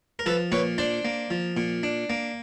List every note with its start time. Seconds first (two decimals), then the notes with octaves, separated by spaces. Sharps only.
0.19 A#4
0.26 F3 A4 B4
0.52 A#2 B4 C#5
0.78 D4 C5 D5
1.05 A#3
1.31 F3
1.57 A#2
1.83 D4
2.10 A#3